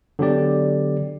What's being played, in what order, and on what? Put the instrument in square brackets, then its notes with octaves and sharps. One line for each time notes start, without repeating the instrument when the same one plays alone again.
[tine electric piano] D3 F#3 B3 G4 D5